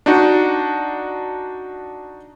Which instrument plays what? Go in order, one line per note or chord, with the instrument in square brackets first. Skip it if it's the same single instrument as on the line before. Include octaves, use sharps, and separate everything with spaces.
[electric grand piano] D4 D#4 F#4